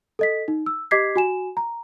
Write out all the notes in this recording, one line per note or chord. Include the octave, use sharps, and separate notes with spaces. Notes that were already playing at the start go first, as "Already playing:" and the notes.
A4 D#5 B6
D#4
E6
G4 D#5 D6 G#6 B6 C7
F#4 G#5 E7
A#5